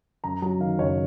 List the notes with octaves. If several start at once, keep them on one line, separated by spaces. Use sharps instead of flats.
F#2 A#5
F#3 A#5
D#3 F5
F#1 C#5